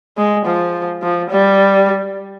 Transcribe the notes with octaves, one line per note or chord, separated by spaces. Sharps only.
G#3
F3
F3
G3